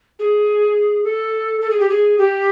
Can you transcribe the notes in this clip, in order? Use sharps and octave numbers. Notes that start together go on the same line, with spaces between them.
G#4
A4
A4
G#4
G4
G#4
G4